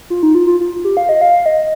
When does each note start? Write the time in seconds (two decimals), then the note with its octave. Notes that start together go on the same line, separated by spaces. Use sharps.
0.10 F4
0.23 D#4
0.35 F4
0.47 F4
0.60 F4
0.84 G4
0.97 F5
1.09 D#5
1.21 F5
1.46 D#5